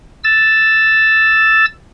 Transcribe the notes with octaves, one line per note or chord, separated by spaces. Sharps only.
E6 A6